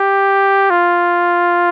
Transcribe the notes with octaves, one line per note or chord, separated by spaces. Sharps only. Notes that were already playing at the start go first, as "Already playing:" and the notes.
Already playing: G4
F4